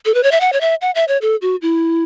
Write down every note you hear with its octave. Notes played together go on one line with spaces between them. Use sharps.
A4
B4
C#5
E5
F#5
C#5
E5
F#5
E5
C#5
A4
F#4
E4